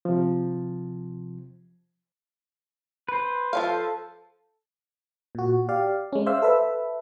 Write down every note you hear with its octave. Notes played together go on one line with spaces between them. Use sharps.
C3 F3
B4 C5
F3 C#4 A4 F5
A#2 F#4
G4 D5 F5
G#3 C#4
C5 D5 E5 F5 E6
A4 B4 E5